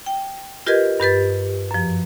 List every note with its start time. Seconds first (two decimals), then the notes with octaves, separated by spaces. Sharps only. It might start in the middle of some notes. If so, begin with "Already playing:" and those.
0.06 G5
0.66 F4 G4 A#4 B4 D#5 G#6
1.00 G2 G4 B4 A6
1.71 F#2 F3